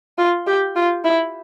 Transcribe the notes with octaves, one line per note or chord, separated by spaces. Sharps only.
F4
G4
F4
E4